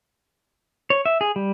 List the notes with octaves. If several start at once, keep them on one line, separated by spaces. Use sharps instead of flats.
C#5
E5
G#4
G3